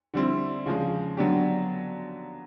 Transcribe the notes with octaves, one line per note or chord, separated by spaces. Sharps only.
D3 G3 C4 E4
C#3 F3 G#3
D3 F#3 B3 D4 G4